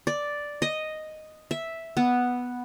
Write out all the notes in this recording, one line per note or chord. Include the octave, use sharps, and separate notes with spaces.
D5
D#5
E5
B3